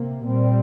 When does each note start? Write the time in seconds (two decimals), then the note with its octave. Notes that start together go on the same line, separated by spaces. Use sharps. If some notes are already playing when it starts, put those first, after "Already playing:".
Already playing: C3 A#3
0.25 A#2 G3 C4